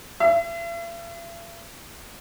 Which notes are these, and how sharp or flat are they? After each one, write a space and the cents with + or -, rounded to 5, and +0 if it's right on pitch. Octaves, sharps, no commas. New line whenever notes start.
E5 +45